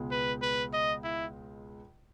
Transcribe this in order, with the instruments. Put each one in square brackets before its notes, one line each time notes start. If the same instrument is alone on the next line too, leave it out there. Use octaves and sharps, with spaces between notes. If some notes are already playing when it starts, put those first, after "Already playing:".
Already playing: [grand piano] C#2 B2 G#3
[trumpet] B4
B4
D#5
E4